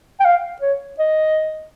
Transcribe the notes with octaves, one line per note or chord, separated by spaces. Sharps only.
G5
F5
C#5
D#5